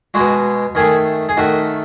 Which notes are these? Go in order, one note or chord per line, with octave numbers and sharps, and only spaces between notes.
B2 G#3 F#4
D#3 A3 G#4
G#4
D#3 A3 F#4